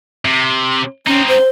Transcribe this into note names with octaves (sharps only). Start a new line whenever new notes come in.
C3
C4 C#4 D#4
C5